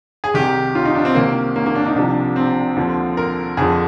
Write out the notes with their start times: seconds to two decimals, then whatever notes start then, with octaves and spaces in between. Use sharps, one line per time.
0.24 G#4
0.34 C2 C3 D#3 G4
0.75 F4
0.85 D#4
0.95 D4
1.05 C4
1.15 C2 C3 D#3 A#3
1.56 A#3
1.66 A#3
1.75 D4
1.86 D#4
1.96 C2 C3 F3 D4
2.36 C4
2.76 D#2 D3 F3
3.17 A#4
3.57 F2 D3 F3 G#4